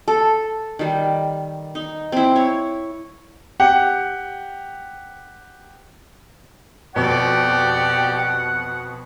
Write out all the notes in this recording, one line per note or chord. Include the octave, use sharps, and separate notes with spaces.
A4
D#3 G3
D#4
C4 E4
C#5
G4 F#5
F2 B2 G4 D5 F#5